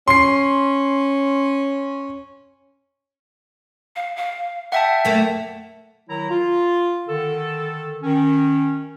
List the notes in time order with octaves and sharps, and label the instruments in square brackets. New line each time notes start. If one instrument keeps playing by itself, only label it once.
[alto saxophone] C#4 [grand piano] C6 C7
[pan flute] F5
F5
[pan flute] E5 [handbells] F#5 G5 A5
[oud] F#2 A3 A#3
[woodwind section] D#3 F#3 E4 A#5
F4
D3 D#3 A4
D#3 C#4